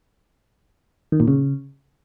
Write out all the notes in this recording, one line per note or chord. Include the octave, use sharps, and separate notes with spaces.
D#3
A#2
C#3